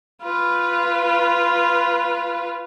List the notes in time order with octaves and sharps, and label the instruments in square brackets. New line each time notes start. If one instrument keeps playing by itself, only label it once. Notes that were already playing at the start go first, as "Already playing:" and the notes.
[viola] F4 B4